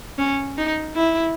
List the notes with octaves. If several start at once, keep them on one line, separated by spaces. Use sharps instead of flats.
C#4
D#4
E4